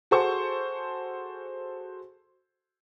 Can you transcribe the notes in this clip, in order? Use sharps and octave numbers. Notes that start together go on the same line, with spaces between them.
F#4 G#4 A4 C5 G#5 C#6